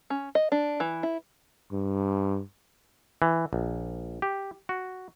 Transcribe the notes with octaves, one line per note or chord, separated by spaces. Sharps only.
C#4
D#5
D4
E3
E4
G2
E3
A#1
G4
F#4